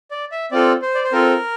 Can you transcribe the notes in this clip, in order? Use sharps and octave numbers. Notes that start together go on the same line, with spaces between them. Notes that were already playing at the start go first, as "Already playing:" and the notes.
D5
E5
C4 F4 A4 D5
C5
D5
C5
C4 F4 A4 A#4